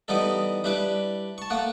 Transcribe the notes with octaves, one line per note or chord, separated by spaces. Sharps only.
E3 G3 B3 D#4 A4
G3 D4 E4 B4
A5 C#6
A3 A#3 F#5